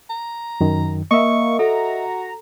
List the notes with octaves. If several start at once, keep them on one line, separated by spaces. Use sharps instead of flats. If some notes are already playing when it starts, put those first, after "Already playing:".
A#5
F#2 D#3
A#3 D#5 E5 C#6
F#4 A4 A#5